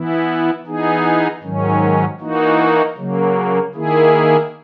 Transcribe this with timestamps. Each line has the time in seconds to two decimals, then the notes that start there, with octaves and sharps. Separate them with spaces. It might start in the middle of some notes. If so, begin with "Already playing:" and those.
Already playing: E3 B3 E4
0.66 E3 B3 D#4 G#4
1.43 G#2 D#3 F#3 C#4
2.20 E3 A#3 D#4 F#4
2.97 C#3 F#3 A#3
3.75 D#3 A#3 E4 G#4